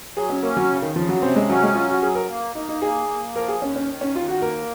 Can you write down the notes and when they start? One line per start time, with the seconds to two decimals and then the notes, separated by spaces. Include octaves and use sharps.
0.16 F#3 G#4
0.29 C#4
0.43 A#3 C#4
0.57 F#3
0.70 C#3
0.82 D#3
0.95 C#3 F3
1.09 F#3
1.22 C3 C4
1.36 G#3
1.50 F#3 C#4
1.63 G#3
1.75 F#3 F4
1.89 F#4
2.02 F#3 G#4
2.15 A#4
2.29 A#3
2.55 A#3 D#4
2.69 D#4
2.82 A#3 G#4
3.08 A#3
3.36 F3 A#4
3.48 G#4
3.61 D#2 C#4
3.76 C#4
3.88 D#3
4.01 C#4
4.15 D#2 F4
4.28 F#4
4.42 A#3 A#4